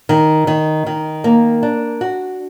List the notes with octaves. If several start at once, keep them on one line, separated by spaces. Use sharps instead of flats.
D#3
D#3
D#3
A#3
D4
F#4